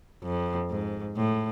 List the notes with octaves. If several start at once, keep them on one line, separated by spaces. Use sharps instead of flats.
F2
G#2
A2